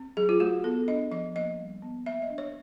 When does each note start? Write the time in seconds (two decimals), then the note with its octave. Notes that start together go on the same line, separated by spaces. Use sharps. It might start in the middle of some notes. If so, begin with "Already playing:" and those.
Already playing: C4
0.17 F#3 G#4
0.29 F4
0.40 A3 F#4
0.64 B3 A4
0.88 D4 D#5
1.11 F3 D#5
1.35 A#3 D#5
1.59 G3
1.82 B3
2.06 A#3 E5
2.22 D#5
2.30 D4
2.38 C#5